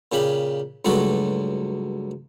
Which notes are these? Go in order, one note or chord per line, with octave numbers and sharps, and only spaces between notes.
A#2 C#3 G4 B5
C#2 G2 F#3 A3 F#4 A4